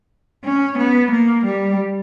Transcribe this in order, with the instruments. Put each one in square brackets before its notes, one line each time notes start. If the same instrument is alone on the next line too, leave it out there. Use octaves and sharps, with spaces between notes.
[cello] C#4
B3
A#3
G3